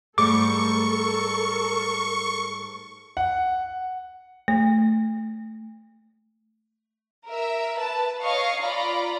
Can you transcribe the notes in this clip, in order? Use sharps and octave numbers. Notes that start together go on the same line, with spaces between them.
G#2 G3 A3 A4 A#4 C#6 D6
F#5
A3
A#4 E5
B4 A5
C#5 D#5 F5 C#6
F4 D5 A#5 B5